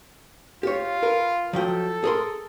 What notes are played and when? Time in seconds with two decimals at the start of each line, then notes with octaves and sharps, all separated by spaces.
0.63 F4 G4 C#5
1.03 A#4 B4
1.53 F3 F#3 A4 G5
2.04 G#4 A#4 C6